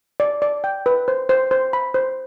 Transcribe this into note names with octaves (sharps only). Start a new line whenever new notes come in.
D5
D5
G5
B4
C5
C5
C5
B5
C5